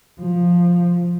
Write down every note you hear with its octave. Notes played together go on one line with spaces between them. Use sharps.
F3